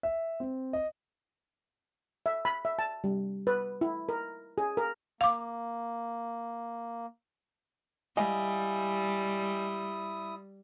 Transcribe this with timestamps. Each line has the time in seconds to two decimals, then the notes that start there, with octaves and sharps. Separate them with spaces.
0.03 E5
0.40 C4
0.73 D#5
2.26 E5
2.45 B5
2.65 E5
2.79 A5
3.04 G3
3.47 B4
3.81 E4
4.09 A#4
4.58 G#4
4.77 A#4
5.21 A#3 F5 D6
8.17 G3 E4 D#5 F5 G#5 D#6